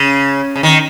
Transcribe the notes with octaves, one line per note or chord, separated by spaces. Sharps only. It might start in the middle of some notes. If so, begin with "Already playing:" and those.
Already playing: C#3
C#3
D#3